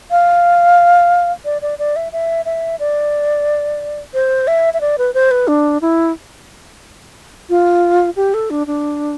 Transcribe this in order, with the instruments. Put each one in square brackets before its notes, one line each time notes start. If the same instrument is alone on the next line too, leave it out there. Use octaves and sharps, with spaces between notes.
[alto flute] F5
D5
D5
D5
E5
E5
E5
D5
C5
E5
E5
D5
B4
C5
B4
D4
E4
F4
G4
A4
D4
D4